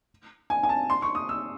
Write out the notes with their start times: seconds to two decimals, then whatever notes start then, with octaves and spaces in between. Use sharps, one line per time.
0.50 G#5
0.63 G#5
0.69 A5
0.90 C6
1.02 C#6
1.15 D#6
1.29 E6